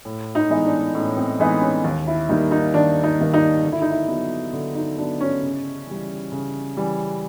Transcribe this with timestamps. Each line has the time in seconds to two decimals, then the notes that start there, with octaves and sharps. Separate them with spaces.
0.05 A2
0.35 D#4
0.50 E3 G#3 B3 D#4
0.65 D4
0.94 A2 C#4
1.17 C4
1.40 E3 G#3 B3 D#4
1.62 C#4
1.84 D#2
2.07 E4
2.29 D#3 G3 A#3 D#4
2.51 D#4
2.74 D#2 D4
3.04 D#4
3.19 D#3 G3 A#3
3.34 D#4
3.64 D3
3.72 E4
3.82 D#4
3.91 E4
4.08 F#3 B3
4.53 D3
4.75 D#4
4.98 F#3 D4
5.01 B3
5.21 C#4
5.43 C#3
5.87 E3 G3
6.32 C#3
6.77 E3 G3